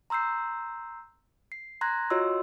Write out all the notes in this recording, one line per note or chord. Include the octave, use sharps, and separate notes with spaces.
A#5 C6 E6 G6 C7
C7
A#5 C6 F#6 G#6 A#6
F4 F#4 C#5 D#5 C6 E6